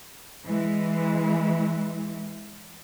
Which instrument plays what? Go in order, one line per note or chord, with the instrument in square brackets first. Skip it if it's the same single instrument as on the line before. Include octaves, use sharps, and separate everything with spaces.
[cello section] E3 G#3